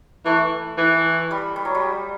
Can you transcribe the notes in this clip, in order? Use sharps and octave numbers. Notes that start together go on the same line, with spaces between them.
E3 A3
E3
G3
G3
F#3
G3